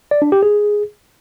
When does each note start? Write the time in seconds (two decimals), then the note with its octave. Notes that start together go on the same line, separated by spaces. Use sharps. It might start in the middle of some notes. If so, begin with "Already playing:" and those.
0.11 D5
0.22 D4
0.32 G4
0.43 G#4